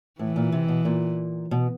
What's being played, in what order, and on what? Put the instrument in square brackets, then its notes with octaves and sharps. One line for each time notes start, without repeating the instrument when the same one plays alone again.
[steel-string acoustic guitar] A2 [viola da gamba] E3
[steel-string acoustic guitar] A#2
C3
B2
A#2
B2